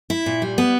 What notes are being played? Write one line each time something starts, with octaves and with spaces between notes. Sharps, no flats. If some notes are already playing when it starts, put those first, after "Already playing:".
E4
A#2
G3
B3